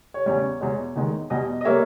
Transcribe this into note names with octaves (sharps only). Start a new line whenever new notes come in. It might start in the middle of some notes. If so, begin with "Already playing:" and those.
C#5
E2 C#3 G3 C#5
E2 B2 G#3 C#5
E2 D#3 G#3
E2 B2 G3 D#5
D#5
G3 A#3 C#5 E5